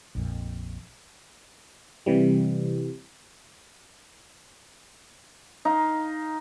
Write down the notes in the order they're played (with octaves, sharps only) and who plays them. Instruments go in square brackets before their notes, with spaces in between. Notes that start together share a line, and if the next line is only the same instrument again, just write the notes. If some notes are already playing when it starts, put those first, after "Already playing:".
[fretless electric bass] A#1 F2 A#2
[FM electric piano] C3 E3 G3
[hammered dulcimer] D#4 F5